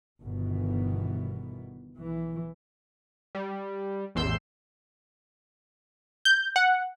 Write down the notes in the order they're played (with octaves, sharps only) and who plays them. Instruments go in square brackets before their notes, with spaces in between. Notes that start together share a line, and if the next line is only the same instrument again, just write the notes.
[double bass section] G1 B2 D#3 E3 B3
B1 E3
[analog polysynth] G3
A1 E2 C6 E6 G6
G6
F#5